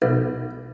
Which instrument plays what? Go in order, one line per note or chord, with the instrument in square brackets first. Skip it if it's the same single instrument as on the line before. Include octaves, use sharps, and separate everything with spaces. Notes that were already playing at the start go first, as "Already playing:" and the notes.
[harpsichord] B1